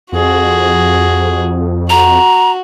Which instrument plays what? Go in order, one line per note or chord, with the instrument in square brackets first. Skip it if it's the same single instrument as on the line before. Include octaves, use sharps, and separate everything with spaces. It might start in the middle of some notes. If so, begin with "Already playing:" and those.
[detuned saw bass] F2 [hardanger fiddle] F#4 G#4
[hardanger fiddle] F#4 [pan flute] A#5